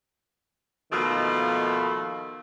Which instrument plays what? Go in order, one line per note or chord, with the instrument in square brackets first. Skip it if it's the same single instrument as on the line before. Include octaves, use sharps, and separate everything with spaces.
[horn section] B2 D#3 F3 A3 A#3